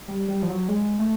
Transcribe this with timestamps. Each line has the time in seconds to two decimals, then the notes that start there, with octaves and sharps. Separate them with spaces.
0.08 G3
0.28 G3
0.42 F3
0.49 F#3
0.69 G#3
0.99 A3